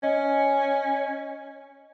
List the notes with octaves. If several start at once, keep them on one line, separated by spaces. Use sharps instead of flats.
C#4 D#5